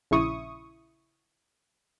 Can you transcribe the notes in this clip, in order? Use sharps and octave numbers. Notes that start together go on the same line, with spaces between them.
A#1 C#3 E4 C#6 D#6